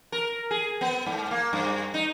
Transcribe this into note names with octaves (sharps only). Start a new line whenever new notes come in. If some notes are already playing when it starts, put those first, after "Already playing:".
A#4
G#4
B3
G#2
A#3
G2
D#4